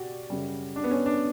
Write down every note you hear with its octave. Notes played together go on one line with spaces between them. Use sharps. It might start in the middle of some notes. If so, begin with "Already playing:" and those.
Already playing: B2 F#4 G4 D5
F#2 C#3 G3
D4
B3
C#4
D4